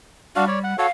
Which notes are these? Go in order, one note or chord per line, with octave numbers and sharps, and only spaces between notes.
G3 D4 F#4 F5
C#5 D5
F#5
F#4 A4 C#5 F5